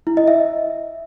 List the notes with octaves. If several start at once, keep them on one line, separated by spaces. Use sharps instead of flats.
E4
D#5
E5